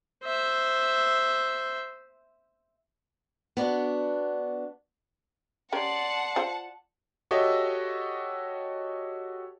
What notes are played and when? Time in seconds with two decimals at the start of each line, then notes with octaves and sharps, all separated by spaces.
0.24 C5 E5
3.57 B3 D4 F#4
5.72 C#4 G4 A#4 D5 F#5 A5 C6
6.36 F4 C5 F5
7.31 F#4 G4 A4 C#5 D#5 E5